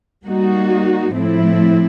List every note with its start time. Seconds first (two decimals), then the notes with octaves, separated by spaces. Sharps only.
0.24 G3 A#3 D#4 F#4
1.12 A2 F3 A3 C4 E4